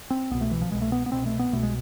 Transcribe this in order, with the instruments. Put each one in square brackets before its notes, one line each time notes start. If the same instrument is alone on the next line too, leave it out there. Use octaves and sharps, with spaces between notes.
[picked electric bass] C4
C2 B2 B3
A3
E3
F3
C2 B2 G#3
A3
B3
B3
C2 B2 C4
A3
B3
C2 B2 A3
G#3